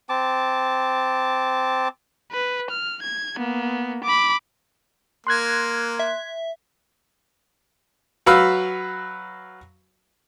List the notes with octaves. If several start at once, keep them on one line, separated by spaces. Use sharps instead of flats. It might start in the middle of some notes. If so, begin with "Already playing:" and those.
C4 A5 D6
B4
F6
G#6
A#3 B3
B5 D6
A#3 C6 F#6 G#6
E5
F#3 F#4 B4 F5 B5 E6